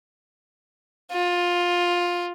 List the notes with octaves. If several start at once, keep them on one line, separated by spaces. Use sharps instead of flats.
F4